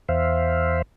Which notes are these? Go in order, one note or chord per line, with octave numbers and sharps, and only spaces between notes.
E2 C5 E5 F5